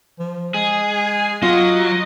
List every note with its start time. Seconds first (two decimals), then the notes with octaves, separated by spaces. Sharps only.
0.19 F3
0.54 G#3 G#4
1.43 F#3 F4 D#5